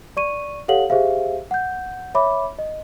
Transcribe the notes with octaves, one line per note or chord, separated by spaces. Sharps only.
D5 C#6 D#7
G4 A4 C#5 F5 F#5 F#7
G4 G#4 C5 E5 F5
F#5 G6
C#5 E5 B5 D6
D#5